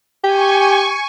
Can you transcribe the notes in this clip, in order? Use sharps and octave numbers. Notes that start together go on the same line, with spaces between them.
G4 G#5 C#6